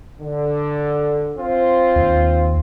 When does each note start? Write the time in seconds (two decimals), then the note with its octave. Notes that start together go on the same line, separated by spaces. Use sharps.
0.20 D3
1.38 C4 F4 C5
1.96 D#2